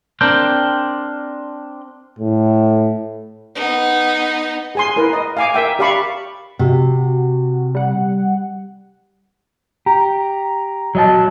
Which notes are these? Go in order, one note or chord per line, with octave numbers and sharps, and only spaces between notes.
C4 D4 A#4 G5
A2
B3 D#4
G#4 G#5 C6
E4 A#4 B4
D#5
F5 G#5 D6
A#4 E5 G5
G4 D5 F5 A5 B5 C#6
C3 F#4
G3 F#5
G4 A#5
F#3 D#5 A5